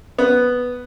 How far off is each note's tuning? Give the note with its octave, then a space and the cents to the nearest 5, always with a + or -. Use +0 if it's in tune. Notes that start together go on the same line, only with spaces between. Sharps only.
B3 +0